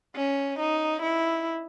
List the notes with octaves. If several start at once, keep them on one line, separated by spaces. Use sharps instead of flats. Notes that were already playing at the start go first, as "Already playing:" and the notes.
C#4
D#4
E4